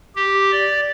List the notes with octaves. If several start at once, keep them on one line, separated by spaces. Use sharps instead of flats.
G4
D5